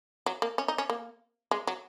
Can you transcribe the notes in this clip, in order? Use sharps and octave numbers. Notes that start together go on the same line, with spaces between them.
F#3
A#3
C#4
D#4
C#4
A#3
G#3
F#3